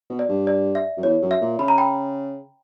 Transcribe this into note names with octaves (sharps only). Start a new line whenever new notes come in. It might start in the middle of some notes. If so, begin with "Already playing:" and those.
B2
D5
G2
D5
E5
F#2
E2 C#5
F#2
E5
A#2
C#3 B5
A#5
G5 B5